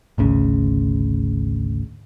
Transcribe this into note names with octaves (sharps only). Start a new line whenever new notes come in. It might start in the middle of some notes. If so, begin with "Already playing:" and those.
G#1 D2 C#3